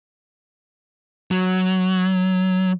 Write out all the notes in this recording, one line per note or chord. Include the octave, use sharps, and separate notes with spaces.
F#3